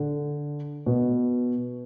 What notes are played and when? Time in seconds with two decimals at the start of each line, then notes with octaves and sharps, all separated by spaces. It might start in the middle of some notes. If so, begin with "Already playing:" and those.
Already playing: D3
0.86 B2